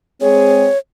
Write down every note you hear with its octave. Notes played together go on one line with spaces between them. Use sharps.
G#3 C4 G#4 C#5